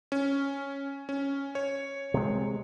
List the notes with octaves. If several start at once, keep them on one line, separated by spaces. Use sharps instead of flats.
C#4
C#4
C#5
C3 G#3